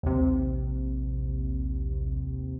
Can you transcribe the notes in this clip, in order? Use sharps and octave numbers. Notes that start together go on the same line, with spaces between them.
A#1 D#2 C3